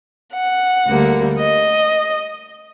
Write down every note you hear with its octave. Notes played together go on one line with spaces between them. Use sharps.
F#5
D2 D3 G3 A#3
D#5